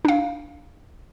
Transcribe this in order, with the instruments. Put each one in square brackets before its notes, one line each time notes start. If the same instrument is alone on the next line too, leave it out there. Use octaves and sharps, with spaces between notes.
[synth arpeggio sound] D4 F5